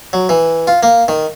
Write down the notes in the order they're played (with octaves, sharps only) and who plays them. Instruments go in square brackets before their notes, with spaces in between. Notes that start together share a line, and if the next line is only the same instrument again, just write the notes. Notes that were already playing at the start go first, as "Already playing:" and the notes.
[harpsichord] F#3
E3
F4
A#3
D#3